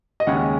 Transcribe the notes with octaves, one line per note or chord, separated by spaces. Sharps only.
D#5
D#2 C#3 G#3 C#4 F#5